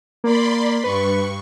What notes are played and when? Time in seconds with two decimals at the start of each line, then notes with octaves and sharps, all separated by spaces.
0.24 A#3 D5 B5 C6
0.84 G2 B4 C#6